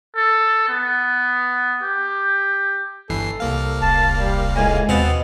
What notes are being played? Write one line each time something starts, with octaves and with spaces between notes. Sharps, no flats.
A4
B3
G4
G1 E3 A4 C7
C2 A#3 F5
D#1 A5
G3
C#2 A2 G#5
D#2 B2 B3 C4 F5 F#5 A6